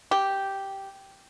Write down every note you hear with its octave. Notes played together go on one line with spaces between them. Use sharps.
G4